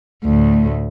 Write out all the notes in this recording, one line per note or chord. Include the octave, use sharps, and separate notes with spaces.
D2 A2